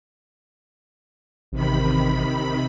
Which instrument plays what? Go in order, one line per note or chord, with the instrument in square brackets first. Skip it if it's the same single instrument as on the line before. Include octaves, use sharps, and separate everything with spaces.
[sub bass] A1 [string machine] C3 D#3 B5